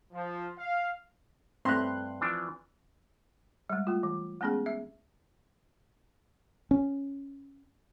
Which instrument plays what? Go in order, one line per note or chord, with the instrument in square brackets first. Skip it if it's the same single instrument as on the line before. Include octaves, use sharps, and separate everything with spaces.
[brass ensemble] F3
F5
[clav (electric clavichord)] G2 E5 A#5 [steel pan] A3 C4 [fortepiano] C6 F#6
[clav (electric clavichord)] E3 F3 D4
[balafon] G3 G#3
A3 F4
E3
G#3 A3 B3 C#4 G#4
E5
[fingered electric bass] C#4